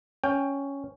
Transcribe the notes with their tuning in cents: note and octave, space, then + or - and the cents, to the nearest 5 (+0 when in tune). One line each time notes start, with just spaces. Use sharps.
C#4 +5 G5 +15